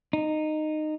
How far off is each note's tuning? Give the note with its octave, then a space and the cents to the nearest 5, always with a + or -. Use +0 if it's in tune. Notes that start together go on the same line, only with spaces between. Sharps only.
D#4 -15